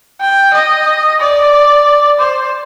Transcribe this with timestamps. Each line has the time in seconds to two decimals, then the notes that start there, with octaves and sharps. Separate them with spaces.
0.21 G5
0.54 D#5
1.20 D5
2.19 C5